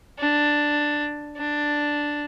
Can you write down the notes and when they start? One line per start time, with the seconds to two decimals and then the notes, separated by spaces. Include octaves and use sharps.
0.19 D4
1.37 D4